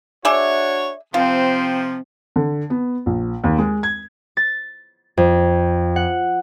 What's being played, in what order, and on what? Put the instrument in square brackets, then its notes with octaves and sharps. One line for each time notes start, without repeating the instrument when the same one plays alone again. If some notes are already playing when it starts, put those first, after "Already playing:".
[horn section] D4 F#4 C#5 [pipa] G#4 D5 E5
[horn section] C3 F3 [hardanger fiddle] C4 [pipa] F4
[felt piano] D3
B3
A#1
D#2
G#3
G#6
[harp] A6
F2
F#5